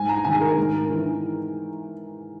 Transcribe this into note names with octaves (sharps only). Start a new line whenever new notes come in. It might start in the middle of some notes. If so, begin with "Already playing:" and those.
Already playing: G#2 G#5
A#5
D#3 G#5
G#4
A#4
G#2
E3